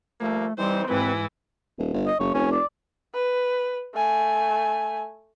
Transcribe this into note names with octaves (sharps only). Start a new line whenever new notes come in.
F3 G3 A3 A#3
E3 G3 C4 D#4 C5
D#2 G#2 E3 C4 B4
D#1
G1
D#5
F#1 C#5
F1 C#4
D5
B4
A3 G#5